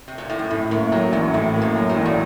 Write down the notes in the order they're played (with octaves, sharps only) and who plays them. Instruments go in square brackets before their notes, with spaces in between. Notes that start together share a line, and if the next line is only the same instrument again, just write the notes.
[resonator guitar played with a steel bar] C3
A#2
A2
F#2
[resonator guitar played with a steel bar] F2 [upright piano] A2
[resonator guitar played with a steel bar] F#2 [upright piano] A#3
[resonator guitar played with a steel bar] A2 [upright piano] F#3
[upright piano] A1 [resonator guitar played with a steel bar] F#2
[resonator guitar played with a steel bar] F2 [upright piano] A2
[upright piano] A#3
[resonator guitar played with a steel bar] F#2
[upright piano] F#3
[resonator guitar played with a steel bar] A2
[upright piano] A1
[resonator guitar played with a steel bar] A#2